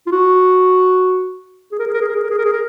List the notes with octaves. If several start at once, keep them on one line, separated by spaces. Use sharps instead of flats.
F4
F#4
G#4
A#4
G#4
A#4
G#4
A#4
G#4
A#4
G#4
A#4
G#4
A#4